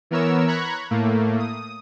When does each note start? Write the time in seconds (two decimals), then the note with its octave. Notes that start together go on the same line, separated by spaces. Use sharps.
0.11 E3 B3 A#4 C#5 E6
0.48 A#5 B5 C#6 F#6 G#6
0.91 A2 A3 A#3
1.39 D#6